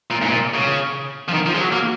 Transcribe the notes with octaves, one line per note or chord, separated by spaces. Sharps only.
A#2
G#2
A#2
C#3
F3
D#3
F3
G#3
F#3
A#3